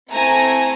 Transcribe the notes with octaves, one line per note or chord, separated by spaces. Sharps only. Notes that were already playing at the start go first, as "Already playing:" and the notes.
A3 C4 E4 A4 G#5 A#5